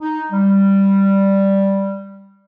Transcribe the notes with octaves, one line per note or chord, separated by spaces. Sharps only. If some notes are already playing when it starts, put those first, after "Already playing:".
D#4
G3